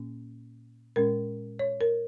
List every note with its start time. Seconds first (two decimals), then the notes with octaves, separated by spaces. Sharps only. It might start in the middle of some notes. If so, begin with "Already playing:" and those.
Already playing: A#2 A#3 C#4
0.96 A#2 G#3 C#4 A#4
1.59 C#5
1.81 A#4